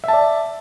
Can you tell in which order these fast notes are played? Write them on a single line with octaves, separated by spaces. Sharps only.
E5 A5 D5